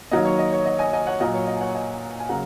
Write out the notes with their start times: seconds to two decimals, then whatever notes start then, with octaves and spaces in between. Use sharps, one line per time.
0.11 D#3 F#3 A#3 D#5
0.25 C#5
0.39 D#5
0.52 C#5
0.66 D#5
0.79 D#5 G#5
0.93 D#5 G#5
1.07 C#5 F#5
1.20 A#2 F#3 A#3 D#5
1.34 C#5
1.47 D#5
1.56 G#5
1.61 C#5 F#5
1.75 D#5 G#5
2.20 G#5
2.29 C#3 F#3 A#3 F#5 A#5